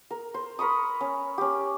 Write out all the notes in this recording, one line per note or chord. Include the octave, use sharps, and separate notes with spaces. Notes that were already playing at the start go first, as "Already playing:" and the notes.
A#4
C5
A#4 B5 C#6 D#6
C#4
C#4 G4